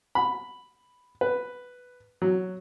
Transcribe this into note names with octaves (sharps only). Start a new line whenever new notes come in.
B5
B4
F#3